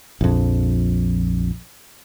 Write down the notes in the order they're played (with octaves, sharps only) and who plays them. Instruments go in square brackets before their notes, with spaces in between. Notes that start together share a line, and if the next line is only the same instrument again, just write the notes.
[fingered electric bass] A#1 F2